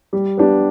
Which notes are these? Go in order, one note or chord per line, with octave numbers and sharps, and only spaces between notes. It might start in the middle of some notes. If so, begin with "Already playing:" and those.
G3
B3 D4 G4